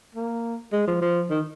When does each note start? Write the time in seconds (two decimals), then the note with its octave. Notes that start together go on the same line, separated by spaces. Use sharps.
0.15 A#3
0.73 G#3
0.87 F3
1.02 F3
1.30 D#3